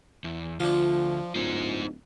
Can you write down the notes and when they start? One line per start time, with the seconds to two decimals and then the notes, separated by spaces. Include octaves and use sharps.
0.24 E2
0.60 D2 F3 D4 F4
1.35 D1 D#4 C5